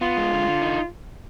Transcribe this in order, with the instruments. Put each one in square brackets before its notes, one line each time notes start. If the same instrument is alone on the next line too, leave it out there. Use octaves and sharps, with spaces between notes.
[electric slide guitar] B3 [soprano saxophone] F4
[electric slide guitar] G#3
D3
D3
D#4